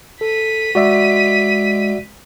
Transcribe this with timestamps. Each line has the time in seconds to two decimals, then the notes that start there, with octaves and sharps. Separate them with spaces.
0.21 A4 B6 D#7
0.75 G#3 F#4 D5 E5